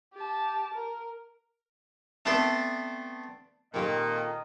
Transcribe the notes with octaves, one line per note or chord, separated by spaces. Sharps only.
G4 A5
A#4
A3 B3 C4 D4 A4
A#2 D#3 C4 G4 A4 D#5